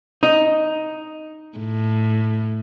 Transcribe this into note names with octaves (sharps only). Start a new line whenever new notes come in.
D#4
A2